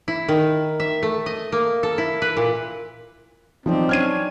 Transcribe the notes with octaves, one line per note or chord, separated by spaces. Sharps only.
E4
D#3
E5
A3
D#5
A#3
A4
E4
B4
A#2
F3 F#3 C4 D#4 D5
C#4 D4 C#5 F6 G#6 D#7